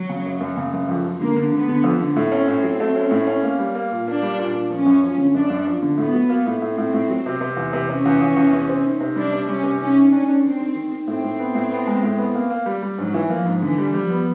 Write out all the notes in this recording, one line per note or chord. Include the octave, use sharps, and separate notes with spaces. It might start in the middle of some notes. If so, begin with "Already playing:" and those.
Already playing: F#3
C#3
F#2
F#2
C#3
F#2
F2
F3
D3 A#3
D3
D3 B3
D3
F2
D3
A2 C4
C#4
A2
F#3
A3
C#4
A2
C#4
A#3
G3
A#3
A#2
A#3 D4
G3
A#2
A#2
F3 C#4
F#2
F3
D3
F#2 D4
F#2
F3
D3
A2 B3
F#3
A#3
A2
A2 C4
A2
A2
F#3
C3
C3
E2
C3
C3 C#4
E2
E2
E2
C3
C4
D#3
C3
G3 D4
C3
G3 C#4
C3
D#3 C#4
D#3
C#4 D4
D4
D#3 C4
D#3
D#3
D#3
A2 C4
A2
B3
A2
B3
G#3
A2
B3
A#3
A#3
G3
G3
G#2 F#3
E3
F3 A#3
G#2
D3 E3
G3
F3 G3
B3